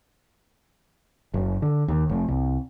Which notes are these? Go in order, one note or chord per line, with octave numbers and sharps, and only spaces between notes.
F#1
D3
D#2
F1
C2